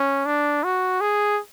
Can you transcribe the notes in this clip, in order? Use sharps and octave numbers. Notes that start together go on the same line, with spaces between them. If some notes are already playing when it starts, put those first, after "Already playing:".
Already playing: C#4
D4
F#4
G#4